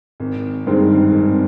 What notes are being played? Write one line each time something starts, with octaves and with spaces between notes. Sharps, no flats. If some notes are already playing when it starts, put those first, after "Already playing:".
G#1
G2 D#3 G#3 C4
G#1